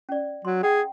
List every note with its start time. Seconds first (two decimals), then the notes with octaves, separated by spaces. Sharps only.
0.09 C#4 D5
0.45 F#3 C6
0.63 G#4 F#5 G5